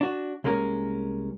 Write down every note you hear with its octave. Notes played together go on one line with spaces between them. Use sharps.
D4 F#4
C2 G#3 A#3 C#4 A#4